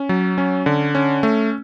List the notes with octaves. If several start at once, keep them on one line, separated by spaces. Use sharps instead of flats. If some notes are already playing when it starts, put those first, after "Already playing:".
Already playing: C#4
F#3
C#4
D3
C#4
A3